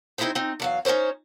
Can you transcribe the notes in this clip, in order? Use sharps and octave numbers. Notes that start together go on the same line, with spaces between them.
C4 D#4 E4 F#4 G#4 C5
C4 D#4
E2 F#3 F5
C#4 D#4 A#4 C5 C#5